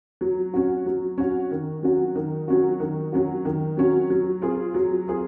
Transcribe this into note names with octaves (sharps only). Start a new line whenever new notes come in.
F#3
C#4 F#4
F#3
C#4 F#4
D#3
F#3 C#4 F#4
D#3
F#3 C#4 F#4
D#3
F#3 C#4 F#4
D#3
F#3 C#4 F#4
F#3
C4 F4 G#4
F#3
C4 F4 G#4